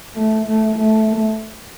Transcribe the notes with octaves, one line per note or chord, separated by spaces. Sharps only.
A3
A3
A3